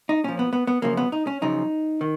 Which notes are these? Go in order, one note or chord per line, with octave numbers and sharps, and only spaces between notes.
D#4
A#2 F3 C#4
B3
B3
B3
F#2 C#3 F3 A#3
B3
D#4
C#4
F#2 C#3 F3 D#4
D#3